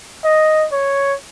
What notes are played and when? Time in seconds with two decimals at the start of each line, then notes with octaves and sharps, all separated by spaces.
0.24 D#5
0.72 C#5